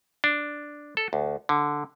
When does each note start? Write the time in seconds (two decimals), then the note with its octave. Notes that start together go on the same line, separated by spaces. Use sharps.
0.24 D4
0.97 A4
1.13 D2
1.49 D3